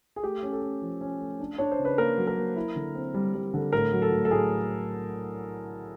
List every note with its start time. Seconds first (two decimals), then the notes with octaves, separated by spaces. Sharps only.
0.16 G#4
0.23 A3 G4
0.43 C#4
0.52 A4
0.62 C#4
0.82 F3
1.01 C#4
1.20 A3
1.40 D4
1.58 D4 C#5
1.72 C5
1.79 C#3
1.85 B4
1.98 A#3 A#4
2.18 F#3
2.27 A#4
2.37 A#3
2.56 E4
2.76 D3
2.95 C4
3.14 G3
3.34 G3
3.54 D3
3.73 A2 A#4
3.92 F#3
4.02 A4
4.12 A2
4.25 A4
4.31 A2 G#4